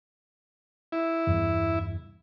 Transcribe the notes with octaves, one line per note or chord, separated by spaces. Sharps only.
E4
E2 G2